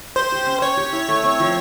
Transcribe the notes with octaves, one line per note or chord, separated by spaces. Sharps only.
G4 C5
G4
C#4
C#4 C#5
G4
E4
A3
C4
F3